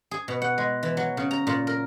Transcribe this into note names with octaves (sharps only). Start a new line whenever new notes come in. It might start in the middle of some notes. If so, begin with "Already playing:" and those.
G#4
B2
F#5
G#3
E3
F#3
C#3
A#5
A#2
A#4